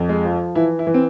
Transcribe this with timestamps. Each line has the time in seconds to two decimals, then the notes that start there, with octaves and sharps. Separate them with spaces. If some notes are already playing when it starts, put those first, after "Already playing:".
Already playing: F2
0.09 G#3
0.25 F3
0.55 E3 E4
0.79 E4
0.87 E3
0.94 C4